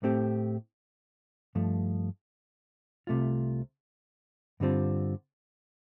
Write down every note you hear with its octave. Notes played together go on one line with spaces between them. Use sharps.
A2 A3 C4 G4
G2 F3 A3
C2 C3 A3 F4
G2 D3 G3 C4 F4